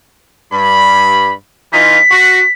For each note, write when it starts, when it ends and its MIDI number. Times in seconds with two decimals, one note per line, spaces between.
0.52 1.34 43
0.52 1.34 83
1.73 1.99 52
1.73 1.99 63
1.73 1.99 65
1.73 2.52 95
2.11 2.41 66